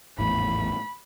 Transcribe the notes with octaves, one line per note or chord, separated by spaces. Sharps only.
G#1 E2 A2 B5